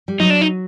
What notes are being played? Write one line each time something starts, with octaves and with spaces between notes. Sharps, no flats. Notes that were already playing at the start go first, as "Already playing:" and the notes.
G3
F#3 D#4
D4
D#4